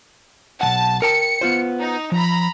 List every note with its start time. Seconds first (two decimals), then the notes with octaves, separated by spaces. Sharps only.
0.61 B1 D#3 F#5 A5
1.02 A#4 G5 A5 C#7
1.41 B3 F4 C5
1.80 D#4
2.12 F3 A#5 B5